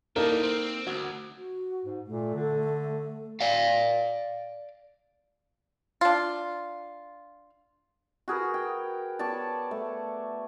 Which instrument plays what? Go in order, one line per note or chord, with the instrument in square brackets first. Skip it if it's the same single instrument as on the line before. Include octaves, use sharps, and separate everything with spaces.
[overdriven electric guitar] E3 G3 [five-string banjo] A#3 D#4 A4 [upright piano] A#4
[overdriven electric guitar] C4
[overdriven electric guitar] D2 [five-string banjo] F#4
[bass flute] F#4
[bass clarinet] G#2
[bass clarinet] A#2 [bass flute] A3
[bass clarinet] D3
[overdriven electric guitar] D5 F5
[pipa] D4 F4
[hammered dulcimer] F#4 G#4 A#4 B4
G5
B3 C#5 D5 A5
A3